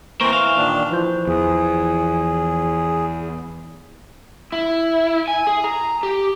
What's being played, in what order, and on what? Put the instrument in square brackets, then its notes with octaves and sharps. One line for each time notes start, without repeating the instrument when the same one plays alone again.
[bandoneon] E3 A#4 C5 [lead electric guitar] A#3 C4 [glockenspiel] C#6
[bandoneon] E3 [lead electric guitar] F5 [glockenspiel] C#6 E7 G7
[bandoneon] A#2 D#3 D4
[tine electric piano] E3 F3 C5
[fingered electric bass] E2 [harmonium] G#4
[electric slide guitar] E4
G#5
G#4
A#5
G4